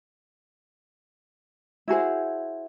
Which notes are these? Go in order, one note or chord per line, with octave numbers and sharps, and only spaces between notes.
E4 F#4 G#4 C5